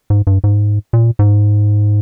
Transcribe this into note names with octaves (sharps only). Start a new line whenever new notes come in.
G#2
G2
G#2
A#2
G#2